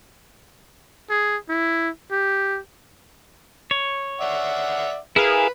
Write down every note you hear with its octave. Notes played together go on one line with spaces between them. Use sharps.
G#4
E4
G4
C#5
D5 E5 F#5
E4 G#4 A#4 B4 F5